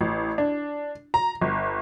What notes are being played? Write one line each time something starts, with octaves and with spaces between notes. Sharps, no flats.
A1
D4
A#5
G1